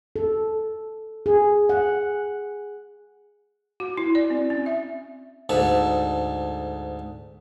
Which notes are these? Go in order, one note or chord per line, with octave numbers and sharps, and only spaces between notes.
A4
G#4
F#5
F#4
E4
D5
C4
C#4
E5
D2 G#2 A4